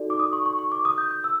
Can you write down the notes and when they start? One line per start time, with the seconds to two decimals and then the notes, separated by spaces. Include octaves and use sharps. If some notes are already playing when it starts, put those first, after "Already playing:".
Already playing: D#4 F#4 A4 D5
0.10 D6
0.19 D#6
0.33 C#6
0.46 C#6
0.59 C#6
0.72 D6
0.85 D#6
0.98 G6
1.11 G6
1.24 E6